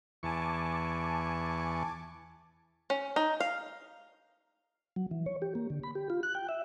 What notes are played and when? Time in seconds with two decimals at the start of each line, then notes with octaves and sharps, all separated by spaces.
0.23 E2 G#5 A5 C#6 D6
2.90 C#4
3.16 D#4
3.40 F5
4.96 F#3
5.11 E3
5.26 C#5
5.42 G4
5.55 A#3
5.70 D3
5.83 B5
5.95 G4
6.10 F4
6.23 F#6
6.35 G5
6.49 E5